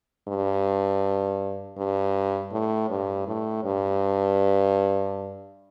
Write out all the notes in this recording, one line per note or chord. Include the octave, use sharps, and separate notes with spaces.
G2
G2
A2
G2
A2
G2